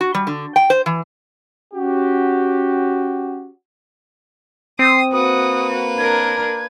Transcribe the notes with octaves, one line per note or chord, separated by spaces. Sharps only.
F#4
G3
D3
G5
C5
E3
C#4 F#4 G4
C4 D#6 C7
A#3 F#4 B4 D#6
D4 A#4 G#6